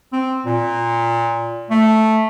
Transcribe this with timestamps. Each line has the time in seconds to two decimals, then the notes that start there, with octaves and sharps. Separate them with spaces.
0.13 C4
0.46 A#2
1.70 A3